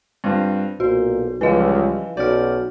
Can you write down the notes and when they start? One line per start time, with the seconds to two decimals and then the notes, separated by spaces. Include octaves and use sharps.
0.24 G2 C4 F4
0.80 B1 A#2 F#4 C5
1.41 C#2 E3 F3 G3 B4 D#5 F5
2.17 B1 C#4 F#4 D5 F6 G6